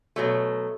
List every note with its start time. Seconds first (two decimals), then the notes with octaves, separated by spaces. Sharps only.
0.16 B2 F#3 A3